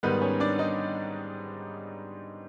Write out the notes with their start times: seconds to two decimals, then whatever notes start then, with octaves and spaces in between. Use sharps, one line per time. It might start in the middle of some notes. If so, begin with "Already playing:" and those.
0.03 G#2 D#3 G3 B3 B4
0.22 C#4 C#5
0.40 D4 D5
0.59 D#4 D#5